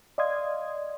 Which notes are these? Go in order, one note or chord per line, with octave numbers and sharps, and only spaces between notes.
D5 D#5 F5 C6 D#6 G#6